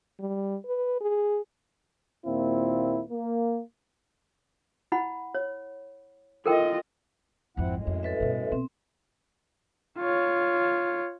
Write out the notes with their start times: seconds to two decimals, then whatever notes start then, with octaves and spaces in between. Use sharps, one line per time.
0.20 G3
0.66 B4
1.01 G#4
2.25 D#2 A#2 C4 E4 F4
3.10 A#3
4.92 E4 F#5 B5
5.35 C#5
6.46 F4 A4 A#4 D#5 G5
7.57 G#1 F2 C4 E4 F#5
7.75 F#2 A2 G#3
7.87 F2
8.03 A4 B4 E5
8.20 G2 B2
8.52 B2 C4
9.98 F4 C#5